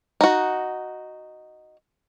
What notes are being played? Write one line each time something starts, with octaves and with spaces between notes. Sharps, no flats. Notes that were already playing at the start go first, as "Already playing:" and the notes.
D#4 F#4